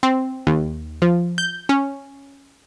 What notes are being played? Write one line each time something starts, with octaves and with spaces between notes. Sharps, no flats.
C4
D#2
F3
G6
C#4